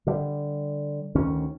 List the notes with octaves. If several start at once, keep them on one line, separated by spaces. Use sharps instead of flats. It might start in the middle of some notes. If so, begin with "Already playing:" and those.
D3 G3
D2 D#3 C#4